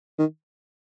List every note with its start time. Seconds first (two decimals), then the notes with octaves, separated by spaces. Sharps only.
0.18 D#3